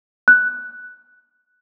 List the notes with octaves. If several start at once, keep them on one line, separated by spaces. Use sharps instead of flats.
F#6